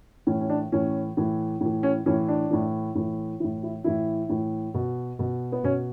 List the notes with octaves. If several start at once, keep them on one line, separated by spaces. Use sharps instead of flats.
A2 E3 C#4
C#4
D4
A2 E3 C#4
A2 E3
A2 E3
C#4
A2 E3 C#4
D4
A2 E3
A2 E3
A2 E3 E4
E4
A2 E3 E4
A2 E3
B2
B2
B3
B2 C#4